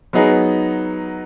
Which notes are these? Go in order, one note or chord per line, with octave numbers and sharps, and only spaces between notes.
F#3 B3 D#4 G#4 B4